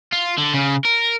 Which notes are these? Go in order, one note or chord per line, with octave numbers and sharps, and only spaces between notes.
F4
D3
C#3
A#4